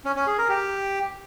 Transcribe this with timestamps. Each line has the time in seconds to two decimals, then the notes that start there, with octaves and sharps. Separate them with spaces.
0.05 C#4
0.16 C#4
0.27 G#4
0.38 A#4
0.49 G4